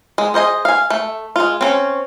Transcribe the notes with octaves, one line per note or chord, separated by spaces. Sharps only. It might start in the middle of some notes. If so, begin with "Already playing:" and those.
G#3
G#4 C5 D#5 G#5
F5 G#5
A3
G#3 F4
C4 C#4 C#5